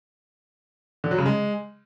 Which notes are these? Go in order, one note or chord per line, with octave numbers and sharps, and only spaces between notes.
D3
F#3
C#3
G#3